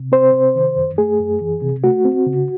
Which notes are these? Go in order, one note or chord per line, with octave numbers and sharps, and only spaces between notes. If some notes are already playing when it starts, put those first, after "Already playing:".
Already playing: C3
C4 C5
C3
D#3
F#2
A3 G#4
F#2
E3
C3
A3 F#4
C4
C#3